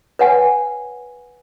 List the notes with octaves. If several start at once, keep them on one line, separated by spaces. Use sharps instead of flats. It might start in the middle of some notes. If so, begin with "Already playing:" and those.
B4 C#5 F#5 G#5